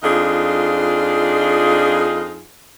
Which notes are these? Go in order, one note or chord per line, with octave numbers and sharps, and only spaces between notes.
F2 D4 D#4 F4 G#4